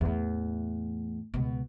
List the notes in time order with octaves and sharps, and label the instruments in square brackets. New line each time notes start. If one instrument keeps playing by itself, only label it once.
[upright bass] E2 A2
C#2 B2